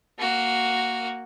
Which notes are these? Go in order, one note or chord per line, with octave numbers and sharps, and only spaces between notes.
A#3 F#4